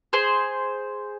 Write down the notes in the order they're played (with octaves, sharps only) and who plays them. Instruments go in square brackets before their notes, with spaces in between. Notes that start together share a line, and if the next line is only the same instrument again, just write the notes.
[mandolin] G#4 C5